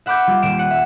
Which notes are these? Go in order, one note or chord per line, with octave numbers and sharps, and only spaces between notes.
E5 F#5 B5 D6 E6 G6
G3 F4
D#1 D7 E7
F#5 C#7 D#7
E5